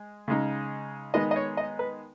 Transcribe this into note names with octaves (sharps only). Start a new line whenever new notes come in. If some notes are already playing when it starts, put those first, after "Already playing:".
Already playing: G#3
C#3 G#3 D#4
D#3 G#3 B3 D#4 D#5
D#5
C#5
D#5
B4